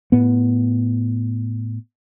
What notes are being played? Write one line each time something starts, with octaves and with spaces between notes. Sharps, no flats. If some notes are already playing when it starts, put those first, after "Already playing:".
A2 B3